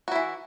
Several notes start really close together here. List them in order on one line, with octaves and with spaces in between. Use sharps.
F#4 E4 E3